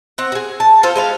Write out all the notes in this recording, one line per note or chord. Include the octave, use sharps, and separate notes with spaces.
C4 F#5
F#4 G#4
A5
F4 A4 C5
G#3 B4 F5